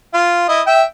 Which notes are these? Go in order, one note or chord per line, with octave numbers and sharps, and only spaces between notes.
F4
E4 D#5
E5 G5